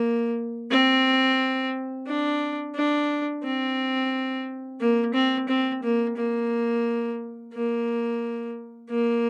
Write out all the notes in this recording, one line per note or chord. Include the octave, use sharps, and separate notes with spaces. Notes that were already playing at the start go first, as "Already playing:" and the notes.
Already playing: A#3
C4
D4
D4
C4
A#3
C4
C4
A#3
A#3
A#3
A#3